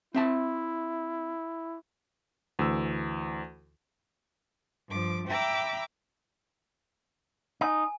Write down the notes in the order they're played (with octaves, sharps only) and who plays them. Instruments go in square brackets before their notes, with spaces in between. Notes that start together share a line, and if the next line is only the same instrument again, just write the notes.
[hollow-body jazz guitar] C4 E5 A5 [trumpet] E4
[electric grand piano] D2 E3 E6
[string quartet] G2 F3 D6
E5 G5 A#5 B5 D6 E6
[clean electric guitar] D#4 [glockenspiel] G#5